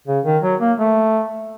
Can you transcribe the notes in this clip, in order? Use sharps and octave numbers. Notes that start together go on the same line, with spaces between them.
C#3
D#3
F#3
A#3
A3